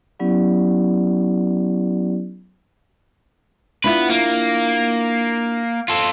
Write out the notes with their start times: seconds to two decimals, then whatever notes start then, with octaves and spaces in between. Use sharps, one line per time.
0.19 F#3 B3 C#4 E4 G4 D5
3.84 B3 D4 E4 F4 B4
4.10 A#3
5.88 F4 A4